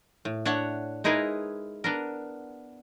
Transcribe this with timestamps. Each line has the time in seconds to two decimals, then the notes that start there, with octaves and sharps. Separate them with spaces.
0.25 A2
0.45 D4 C#5 E5 F#5
1.04 G#3 D#4 E4 G#4 A#4 B4
1.84 B3 D4 A#4